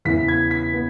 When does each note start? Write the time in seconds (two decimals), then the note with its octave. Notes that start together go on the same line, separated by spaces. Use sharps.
0.05 E2 C#3 E3 B3 B6
0.28 G#6
0.51 B6
0.73 B3